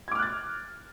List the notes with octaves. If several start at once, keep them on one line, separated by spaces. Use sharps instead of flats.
D6 F6 F#6 G#6 A6